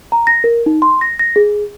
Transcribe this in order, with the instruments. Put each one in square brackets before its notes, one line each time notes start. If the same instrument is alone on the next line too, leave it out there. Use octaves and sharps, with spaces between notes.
[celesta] A#5
A#6
A#4
D#4
C6
A#6
A#6
G#4